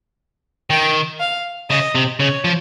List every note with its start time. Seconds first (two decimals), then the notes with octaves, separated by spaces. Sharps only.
0.70 D#3 G5
1.20 F5
1.70 C#3 D#5
1.95 C3
2.20 C#3 C#5
2.44 F3